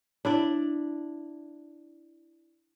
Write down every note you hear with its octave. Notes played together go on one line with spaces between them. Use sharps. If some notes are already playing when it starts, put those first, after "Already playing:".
D4 E4 D5